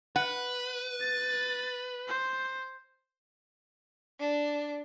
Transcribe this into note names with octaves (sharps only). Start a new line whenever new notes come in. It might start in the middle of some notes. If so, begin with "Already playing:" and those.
B4 F#5
A6
C5
D4